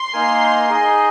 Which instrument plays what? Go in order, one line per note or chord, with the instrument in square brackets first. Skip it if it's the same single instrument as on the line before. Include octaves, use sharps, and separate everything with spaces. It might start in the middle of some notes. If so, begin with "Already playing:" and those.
Already playing: [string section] C6
[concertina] A#3 D#4 A#4 G#5
D#4 G#4 D#5